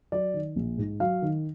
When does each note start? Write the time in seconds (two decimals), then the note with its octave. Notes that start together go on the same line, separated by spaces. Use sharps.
0.12 F#3 D5
0.34 D#3
0.56 A#1
0.78 G#2
1.00 F#3 F5
1.22 D#3